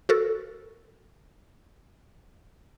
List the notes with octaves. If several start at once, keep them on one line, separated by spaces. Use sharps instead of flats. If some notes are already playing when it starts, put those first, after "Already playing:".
F#4 A4 A#4